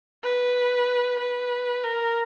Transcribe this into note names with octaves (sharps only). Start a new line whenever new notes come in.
B4
B4
A#4